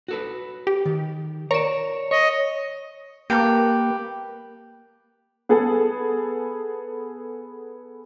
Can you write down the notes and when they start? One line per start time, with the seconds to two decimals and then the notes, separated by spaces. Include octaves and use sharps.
0.08 F#4 A4 B4
0.67 G4
0.85 D#3
1.51 A#4 C#5 D5 A#5 E7
2.11 C#5 D#5
3.30 A#3 G4 A4 B4
5.49 B3 G#4 A4